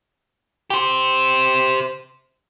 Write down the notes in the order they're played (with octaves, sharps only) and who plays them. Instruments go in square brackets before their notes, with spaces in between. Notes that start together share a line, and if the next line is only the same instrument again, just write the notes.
[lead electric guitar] G4 C5